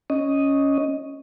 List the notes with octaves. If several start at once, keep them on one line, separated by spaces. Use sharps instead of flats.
C#4 D#5